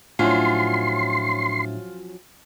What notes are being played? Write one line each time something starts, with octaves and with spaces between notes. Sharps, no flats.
A2 F3 F#3 C#4 D4 F4 E5 C6